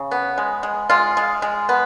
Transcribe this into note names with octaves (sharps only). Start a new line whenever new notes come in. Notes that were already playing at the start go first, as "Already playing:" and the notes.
Already playing: C#3
B3
G#3
G#3
G#3 F4
G#3
G#3
B3